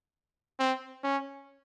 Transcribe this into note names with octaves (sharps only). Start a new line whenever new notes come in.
C4
C#4